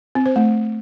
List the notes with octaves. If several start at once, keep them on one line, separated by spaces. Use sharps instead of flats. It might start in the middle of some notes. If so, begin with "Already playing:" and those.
C4
C5
A3